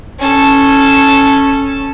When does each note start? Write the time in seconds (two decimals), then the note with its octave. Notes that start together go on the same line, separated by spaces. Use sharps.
0.19 C#4 A4